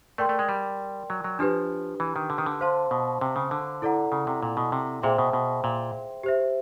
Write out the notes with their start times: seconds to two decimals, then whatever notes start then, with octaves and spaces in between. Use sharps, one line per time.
0.18 A3 A#4 D5 G5 C6
0.29 A3
0.39 G#3
0.49 G3
1.10 F#3
1.24 F#3
1.39 F3 D4 G4 B4
2.00 E3
2.16 D#3
2.30 D3
2.38 D#3
2.46 D3
2.61 C5 F5 A5 C6
2.91 B2
3.21 C3
3.36 C#3
3.51 D3
3.82 E4 A4 D5 F#5 A#5
4.12 C#3
4.27 C3
4.43 A#2
4.57 B2
4.72 C3
5.02 A#2 G#4 C5 E5 G5 C6
5.18 B2
5.33 B2
5.64 A#2
6.23 G4 C5 E5